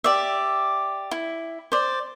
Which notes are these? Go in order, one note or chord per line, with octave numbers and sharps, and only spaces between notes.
G4 D5 E5
E4
C5 D5